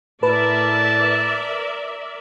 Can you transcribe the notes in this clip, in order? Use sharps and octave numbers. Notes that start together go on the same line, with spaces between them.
A2 A#4 B4 D5 E5 A5